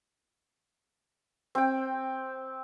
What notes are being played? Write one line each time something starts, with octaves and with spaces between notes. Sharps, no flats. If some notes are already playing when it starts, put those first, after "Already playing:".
C4 G5